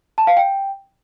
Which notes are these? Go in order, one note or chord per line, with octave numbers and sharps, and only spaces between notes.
A5
F5
G5